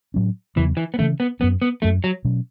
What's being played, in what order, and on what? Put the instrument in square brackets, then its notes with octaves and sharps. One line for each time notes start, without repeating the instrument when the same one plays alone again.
[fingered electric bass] A2 F#3 C#4
[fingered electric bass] E2 C#3 F#3 B3 [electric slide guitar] E3
[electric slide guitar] E3
B3
[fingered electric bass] C#3 E3 C#4 [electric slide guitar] A3
[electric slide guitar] B3
[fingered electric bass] F#2 F#3 C#4 [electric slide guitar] B3
[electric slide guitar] B3
[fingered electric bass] F#2 F#3 C#4 [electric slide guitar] A3
[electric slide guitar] F#3
[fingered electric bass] B2 F#3 C#4